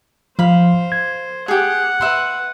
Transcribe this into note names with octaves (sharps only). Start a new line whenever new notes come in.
F3 C5 F5 B5
G#6
G4 G#4 F#5
B4 E5 C6